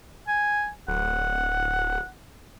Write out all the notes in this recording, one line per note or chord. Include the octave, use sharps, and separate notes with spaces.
G#5
D1 F#5